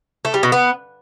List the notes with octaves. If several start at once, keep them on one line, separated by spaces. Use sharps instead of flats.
A3
G3
B2
B3